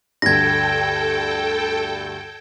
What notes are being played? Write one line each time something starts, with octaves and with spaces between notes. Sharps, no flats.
D2 G2 A4 G5 G#6 A#6